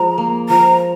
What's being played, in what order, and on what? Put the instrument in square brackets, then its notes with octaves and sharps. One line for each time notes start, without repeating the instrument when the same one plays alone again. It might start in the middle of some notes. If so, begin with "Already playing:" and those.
Already playing: [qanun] F3 G#3 [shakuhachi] A#5
[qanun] A#3
[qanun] F3 [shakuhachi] A#5